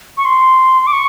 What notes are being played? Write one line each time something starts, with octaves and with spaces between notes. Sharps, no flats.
C#6
C6
D6
C#6